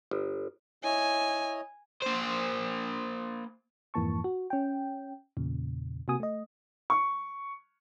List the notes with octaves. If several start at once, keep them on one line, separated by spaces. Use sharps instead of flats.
G1
E4 C#5 D#5 G#5
A#3 C5
F2 G#2 E3 A#3 A5 C#6
F#4
C#4 G5
E2 A#2 C#3
C3 A#3 F#4 G#5 D#6
A3 D#5
C#6